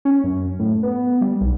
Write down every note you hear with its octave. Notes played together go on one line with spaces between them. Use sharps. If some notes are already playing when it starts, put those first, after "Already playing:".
C#4
F#2
A2
B3
G3
B1